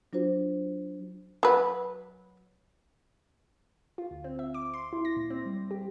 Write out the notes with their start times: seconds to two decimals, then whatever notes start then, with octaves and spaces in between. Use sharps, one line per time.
0.13 F#3 D4 F4 F#4 C5
1.43 F#3 B4
3.98 F4
4.11 D2
4.24 C4
4.39 E5
4.54 D6
4.74 C6
4.93 E4
5.05 A#6
5.16 A#2
5.30 C4
5.46 G3
5.71 G4